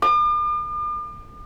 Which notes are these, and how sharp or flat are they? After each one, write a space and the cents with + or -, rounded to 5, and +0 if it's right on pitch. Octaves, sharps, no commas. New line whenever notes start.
D6 +45